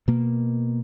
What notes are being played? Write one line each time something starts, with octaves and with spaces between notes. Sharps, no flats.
B2 A#3